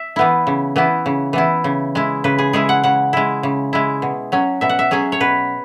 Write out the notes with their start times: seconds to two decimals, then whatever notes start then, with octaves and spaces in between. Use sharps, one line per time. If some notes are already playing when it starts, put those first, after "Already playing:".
Already playing: E5
0.16 E3 B3 E4
0.47 C#3
0.76 E3 B3 E4
1.06 C#3
1.33 E3 B3 E4
1.64 C#3
1.95 G#3 E4
2.24 C#3 B4
2.38 G#4
2.53 G#3 E4 G#4
2.69 F#5
2.83 C#3 F#5
3.13 G#3 E4
3.43 C#3
3.73 G#3 E4
4.02 B2
4.32 F#3 C#4
4.61 B2 E5
4.69 F#5
4.79 E5
4.91 F#3 C#4 G#4
5.12 C#5
5.20 B2 B4